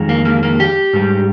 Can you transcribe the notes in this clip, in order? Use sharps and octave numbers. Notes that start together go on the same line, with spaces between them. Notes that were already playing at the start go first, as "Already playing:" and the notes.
Already playing: F2 D#3 G#3
A#3
A#3
A#3
G4
G#2 G3